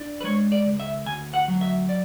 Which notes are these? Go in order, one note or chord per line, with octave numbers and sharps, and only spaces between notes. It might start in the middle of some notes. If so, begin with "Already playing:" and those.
Already playing: D4
B4
G#3 C#5
D5
C#2
E5
D2 G#5
F#5
F#3
E5
D5